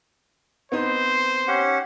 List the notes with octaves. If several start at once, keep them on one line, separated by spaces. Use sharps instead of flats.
B3 C4 D#4 C5
C#4 G4 F#5